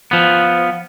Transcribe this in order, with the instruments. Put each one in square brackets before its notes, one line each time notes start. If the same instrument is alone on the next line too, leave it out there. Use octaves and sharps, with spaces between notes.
[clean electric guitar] F3 B3